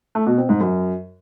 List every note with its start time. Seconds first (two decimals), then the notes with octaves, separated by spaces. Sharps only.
0.15 A3
0.26 B2
0.38 C4
0.49 G#2
0.60 F#2